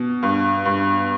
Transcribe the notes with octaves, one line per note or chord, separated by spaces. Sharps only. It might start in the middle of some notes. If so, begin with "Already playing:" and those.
Already playing: B2
G2
G2